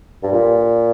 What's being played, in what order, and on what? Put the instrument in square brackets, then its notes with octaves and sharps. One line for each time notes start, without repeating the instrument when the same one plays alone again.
[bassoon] G2
A#2